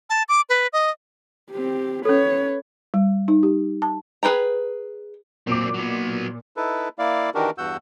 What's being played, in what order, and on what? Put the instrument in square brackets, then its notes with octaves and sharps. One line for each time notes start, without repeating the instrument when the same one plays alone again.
[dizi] A5
D6
B4
D#5
[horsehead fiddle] C4 G4
[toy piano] C#4 A4 [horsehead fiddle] B4 C#5
[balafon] G3
D#4
G4
A5
[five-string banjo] G#4 B4 G5 A#5
[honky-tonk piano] A#2 D6 [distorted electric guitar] F#3 C4
[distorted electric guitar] F#3 B3
[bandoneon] D#4 E4 A4 B4
A#3 E4 D5 F5
D#3 E3 D4 F#4 G4 A#4
E2 G2 F#4 F#5 E6 G6